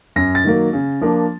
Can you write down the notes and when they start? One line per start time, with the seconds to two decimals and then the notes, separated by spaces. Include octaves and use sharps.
0.16 F#2 A#6
0.35 A6
0.44 D#3 F#3 A#3
0.73 C#3
1.01 F3 A#3 D4